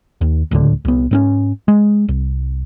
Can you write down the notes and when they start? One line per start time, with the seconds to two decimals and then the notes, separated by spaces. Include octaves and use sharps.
0.21 D#2
0.51 D1 C#2 A2 D3
0.85 C2 B3
1.11 G#2 C4 C#4
1.68 G#3
2.09 C2